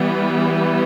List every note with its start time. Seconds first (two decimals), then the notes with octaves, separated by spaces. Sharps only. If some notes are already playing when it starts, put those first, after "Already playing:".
Already playing: E3 G3 B3